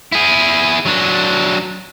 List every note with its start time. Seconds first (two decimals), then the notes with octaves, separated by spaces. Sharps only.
0.12 E4 G#4
0.86 F#3 D4